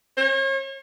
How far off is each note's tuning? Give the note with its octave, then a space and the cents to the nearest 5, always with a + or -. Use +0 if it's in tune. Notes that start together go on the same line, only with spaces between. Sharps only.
C#5 -40